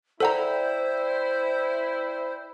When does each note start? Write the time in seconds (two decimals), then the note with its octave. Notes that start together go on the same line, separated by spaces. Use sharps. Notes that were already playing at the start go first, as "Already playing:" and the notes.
0.20 E4 A4 C5 D5 F#5 G5 A#5